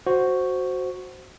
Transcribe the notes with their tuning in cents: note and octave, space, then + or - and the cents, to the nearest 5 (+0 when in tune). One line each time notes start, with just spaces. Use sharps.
F#4 +0 C5 +0